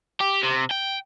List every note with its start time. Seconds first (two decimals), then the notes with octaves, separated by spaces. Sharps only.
0.21 G4
0.43 C3
0.71 G5